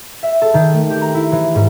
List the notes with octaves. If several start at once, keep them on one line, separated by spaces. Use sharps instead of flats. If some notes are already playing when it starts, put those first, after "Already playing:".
E5
A4
D#3
A3
G4
A#5
E4
E3
G#2